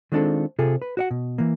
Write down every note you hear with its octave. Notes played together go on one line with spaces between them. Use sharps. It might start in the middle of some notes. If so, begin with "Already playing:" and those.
D#3 G#3 C4 D4 F4 A4
C3 F4 G#4 A4
B4
F#4 C#5 F#5
B2
E3 A#3